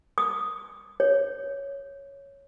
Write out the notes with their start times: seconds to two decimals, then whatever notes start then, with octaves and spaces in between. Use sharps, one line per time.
0.18 D#6
1.00 C#5